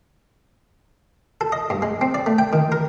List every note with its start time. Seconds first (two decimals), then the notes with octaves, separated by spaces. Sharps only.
1.41 A4
1.52 D#5
1.70 G2
1.82 G#3
2.01 C4
2.14 D5
2.26 A3
2.38 G5
2.53 D#3
2.72 A#4